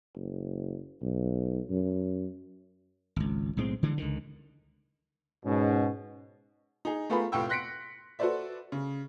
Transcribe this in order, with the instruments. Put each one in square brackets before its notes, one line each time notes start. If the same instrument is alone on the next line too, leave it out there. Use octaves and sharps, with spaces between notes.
[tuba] F#1
B1
F#2
[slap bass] G#1 C#2
B1 A2 G#3 C4
D3 E3 G#3
C#2 D3 D#3
[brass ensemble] G#2 B2 C#4
[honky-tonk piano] D#4 G#4
A3 B3 F4 G#4 A#4 B5
F1 A2 F4 G5 C#6 E6
C6 F#6 A#6 B6 C#7 D7
F#4 A4 B4 C5 D5 E5
C#3